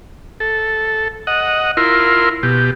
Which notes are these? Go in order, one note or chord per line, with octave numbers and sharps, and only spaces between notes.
A4
D#5 F#5
E4 F4 A#4 C6
B2 G4